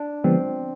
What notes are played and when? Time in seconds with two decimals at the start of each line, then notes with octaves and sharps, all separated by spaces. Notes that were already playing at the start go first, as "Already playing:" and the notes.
Already playing: D4
0.24 D3 F3 G#3 B3 C4